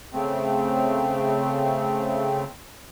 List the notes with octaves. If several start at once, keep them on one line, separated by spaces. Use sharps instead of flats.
C#3 A3 C4